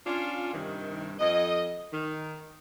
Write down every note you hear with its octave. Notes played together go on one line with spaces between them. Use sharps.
C#4 D4 F4
G2 C3 D#3
F2 D#5
D#3